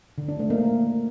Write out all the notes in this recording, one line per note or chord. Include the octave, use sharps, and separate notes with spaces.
D3
D4
A3
A#3